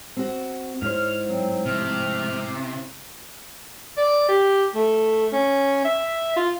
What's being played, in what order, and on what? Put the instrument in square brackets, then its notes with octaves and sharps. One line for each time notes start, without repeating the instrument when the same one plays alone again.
[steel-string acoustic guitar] C4 F#4
[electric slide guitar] G#2 [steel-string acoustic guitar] E4 C5 [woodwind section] C#5 F6
[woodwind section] F#3 C4
[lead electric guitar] C3 [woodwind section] F3 A3 F6
[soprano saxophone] D5
G4
A3
C#4
E5
F4